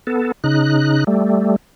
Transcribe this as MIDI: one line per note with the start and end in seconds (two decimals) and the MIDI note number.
0.07 0.32 59
0.07 0.32 69
0.44 1.04 49
0.44 1.04 63
0.44 1.04 90
1.07 1.56 55
1.07 1.56 57